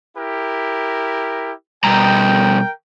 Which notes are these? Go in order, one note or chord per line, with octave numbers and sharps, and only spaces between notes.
E4 G4 A#4
B2 G3 A#4 G5 A#5